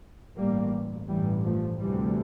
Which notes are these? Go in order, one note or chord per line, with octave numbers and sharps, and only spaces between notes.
A1 G2 G3 A#3
A1 G2 E3 G3
F3 A3
D2 C3 E3 G3